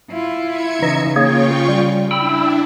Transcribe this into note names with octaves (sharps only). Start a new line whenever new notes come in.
E4 F4
E5 G#6 C#7
C#3 E3 D#4 D#5
A#3 F4 G#4 C#5 G5 C#6
G3
D4 E4 G5 B5 E6